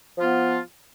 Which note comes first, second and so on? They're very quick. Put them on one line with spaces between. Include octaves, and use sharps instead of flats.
F3 F4 B3